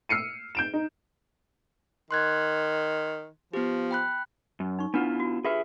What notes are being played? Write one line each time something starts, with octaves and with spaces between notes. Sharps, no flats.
E6 F6 C7 C#7 D#7
G6 D7 E7
D#4
D#3 C6 F#6 G#6
F3 B3 G4
G5 B5 F#6
F#2
D#4 C#6
B3 D4 E4 F4 B4 F#5
F#4
F4 G4 G#4 B4 E5